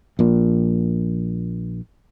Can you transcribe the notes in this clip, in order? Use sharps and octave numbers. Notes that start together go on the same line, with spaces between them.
A#1 A#2